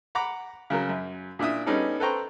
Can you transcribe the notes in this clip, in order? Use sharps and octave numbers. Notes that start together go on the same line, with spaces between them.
F#5 A#5 B5 D6
C#3 F#3 A#4
F#2
A#2 D4 E4 E5 D#6
G3 B3 C#4 D#4 G#4 A4
A4 B4 C5 G5 A#5 C#6